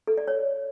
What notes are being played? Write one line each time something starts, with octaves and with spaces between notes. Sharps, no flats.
A4
D5
C#5